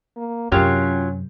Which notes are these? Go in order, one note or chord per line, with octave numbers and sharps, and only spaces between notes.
A#3
F#2 C3 F#3 C#4 F4 G4 A#4 C#5